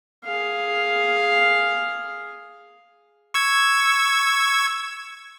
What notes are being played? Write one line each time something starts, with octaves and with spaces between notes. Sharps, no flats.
G#4 F5
C#6 E6 G#6